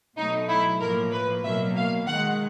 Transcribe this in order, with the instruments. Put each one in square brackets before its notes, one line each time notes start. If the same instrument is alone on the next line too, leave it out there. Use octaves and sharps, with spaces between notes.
[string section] B2 F#3 A3 D#4
E4
A2 F3 A#3 A#4
B4
B2 F#3 A#3 E5
F5
D#3 G#3 F#5